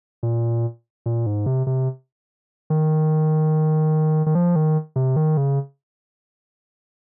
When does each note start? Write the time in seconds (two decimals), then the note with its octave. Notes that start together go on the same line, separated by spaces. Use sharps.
0.23 A#2
1.06 A#2
1.26 G#2
1.46 C3
1.67 C3
2.70 D#3
4.26 D#3
4.35 F3
4.56 D#3
4.96 C3
5.16 D#3
5.37 C#3